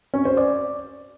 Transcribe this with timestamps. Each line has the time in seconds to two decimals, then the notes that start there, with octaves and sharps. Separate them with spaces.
0.14 C#4
0.25 C5
0.37 D5